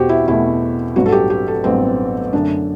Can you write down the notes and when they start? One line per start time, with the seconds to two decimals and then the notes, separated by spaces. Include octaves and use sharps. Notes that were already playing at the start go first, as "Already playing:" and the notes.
Already playing: E2 B2 A3 F#4 G4 C5
0.09 E4
0.27 E2 B2 A3 E4
0.96 A1 G2 F#3 B3 F#4
1.06 A4
1.12 G4
1.30 G4
1.48 A4
1.64 A1 G2 F#3 B3 C4
2.33 F#2 D3 A3 D4